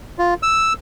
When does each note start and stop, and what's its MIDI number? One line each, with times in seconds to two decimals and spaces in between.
0.19 0.34 65
0.43 0.73 88